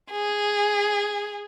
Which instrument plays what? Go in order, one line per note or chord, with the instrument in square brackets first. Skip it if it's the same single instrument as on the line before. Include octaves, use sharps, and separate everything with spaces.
[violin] G#4